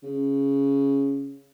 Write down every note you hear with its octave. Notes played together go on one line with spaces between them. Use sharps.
C#3